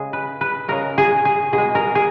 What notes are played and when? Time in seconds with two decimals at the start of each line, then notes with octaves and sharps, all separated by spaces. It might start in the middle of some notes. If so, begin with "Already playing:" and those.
Already playing: C#3 G#3 G#4
0.13 B4
0.41 B4
0.68 C#3 G#3 A#4
0.98 G#4
1.25 G#4
1.53 B2 G#4
1.58 G#3
1.75 A#4
1.95 G#4